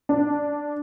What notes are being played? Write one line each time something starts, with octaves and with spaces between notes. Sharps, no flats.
D4